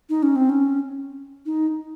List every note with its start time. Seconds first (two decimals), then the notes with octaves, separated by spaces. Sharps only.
0.09 D#4
0.23 C#4
0.36 C4
0.49 C#4
1.46 D#4